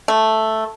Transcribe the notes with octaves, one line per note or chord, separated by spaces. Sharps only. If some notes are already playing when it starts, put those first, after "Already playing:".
A3